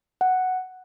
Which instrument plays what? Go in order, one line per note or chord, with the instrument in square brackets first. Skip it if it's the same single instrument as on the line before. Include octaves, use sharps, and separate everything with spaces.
[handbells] F#5